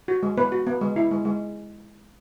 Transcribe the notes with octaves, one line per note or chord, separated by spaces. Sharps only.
F#4
G#3
B3 B4
F#4
B3
G#3
E4
G#3
G#3